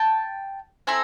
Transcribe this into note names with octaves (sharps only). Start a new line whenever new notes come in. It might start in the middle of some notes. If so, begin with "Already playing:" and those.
Already playing: G5 A5
C4 E4 A4 G#5 A#5